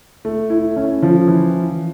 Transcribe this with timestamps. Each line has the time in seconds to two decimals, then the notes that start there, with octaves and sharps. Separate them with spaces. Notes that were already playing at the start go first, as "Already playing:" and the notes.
0.25 A3
0.50 E4
0.76 C#4
1.03 F3
1.28 E3